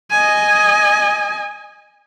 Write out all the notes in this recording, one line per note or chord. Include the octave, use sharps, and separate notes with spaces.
D#5 G#5